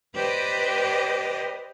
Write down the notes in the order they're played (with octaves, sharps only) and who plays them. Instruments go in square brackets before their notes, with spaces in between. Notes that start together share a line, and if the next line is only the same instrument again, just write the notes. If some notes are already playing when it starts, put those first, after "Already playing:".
[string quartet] G4 B4 C5 D5 D#5